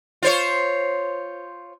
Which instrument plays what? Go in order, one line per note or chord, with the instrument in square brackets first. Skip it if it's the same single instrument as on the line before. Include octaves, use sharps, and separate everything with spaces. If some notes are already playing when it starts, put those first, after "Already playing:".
[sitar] F4 C5 C#5